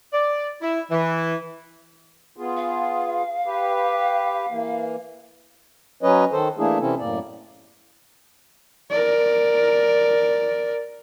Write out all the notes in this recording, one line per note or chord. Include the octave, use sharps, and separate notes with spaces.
D5
E4
E3
B3 F4 G#4
F5
G4 B4
E3 A#3
F#3 C#4 B4 C#5 D#5
D#3 A4 C5
E3 A3 A#3 D4 E4 G#4
C3 E3 C4 C#4 E4 A4
F#2 A2 A#3 D5
A#4 D5